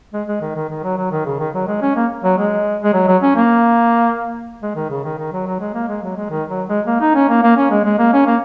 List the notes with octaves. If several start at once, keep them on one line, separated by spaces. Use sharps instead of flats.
G#3
G#3
D#3
D#3
D#3
F#3
F#3
D#3
C#3
D#3
F#3
G#3
C#4
A#3
F#3
G#3
G#3
F#3
F#3
C#4
A#3
G#3
D#3
C#3
D#3
D#3
F#3
F#3
G#3
A#3
G#3
F#3
G#3
D#3
F#3
G#3
A#3
D#4
C#4
A#3
A#3
C#4
G#3
G#3
A#3
C#4
A#3